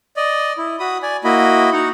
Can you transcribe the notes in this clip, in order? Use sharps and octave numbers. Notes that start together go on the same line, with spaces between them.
D5 D#5
E4
F#4 B5 D#6
D5 G#5
A#3 E4 F#4 D#5 B5
D#4 F#4 F#5